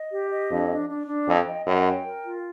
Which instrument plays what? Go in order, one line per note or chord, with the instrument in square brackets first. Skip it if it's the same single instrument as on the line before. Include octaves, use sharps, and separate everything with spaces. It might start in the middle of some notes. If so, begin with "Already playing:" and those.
Already playing: [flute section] D#5
G4
D#5
[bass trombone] F2 [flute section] D4
[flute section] D4
D4
D4
[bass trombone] F2 [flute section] G5
[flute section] D#5
[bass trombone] F#2 [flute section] G5
[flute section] G5
A#4
F4